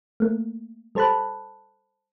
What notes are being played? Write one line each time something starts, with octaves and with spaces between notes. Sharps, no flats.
A3 A#3
G3 A4 C5 A5 B5 F#6